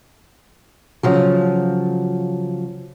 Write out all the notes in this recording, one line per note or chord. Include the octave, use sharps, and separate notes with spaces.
C#3 F3 F#3